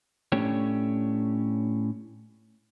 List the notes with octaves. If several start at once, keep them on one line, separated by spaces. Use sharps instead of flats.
A2 A3 C#4 D4 G4 C#5